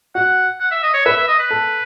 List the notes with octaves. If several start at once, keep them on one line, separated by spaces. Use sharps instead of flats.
F#4 F#5
F#5
E5
D#5
C#5
B4 E5
E5
D#5
B4
A4